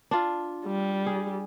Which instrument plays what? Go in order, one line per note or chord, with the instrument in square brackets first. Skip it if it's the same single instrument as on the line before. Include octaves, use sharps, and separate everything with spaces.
[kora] D4 F4
[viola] G3
[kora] G#4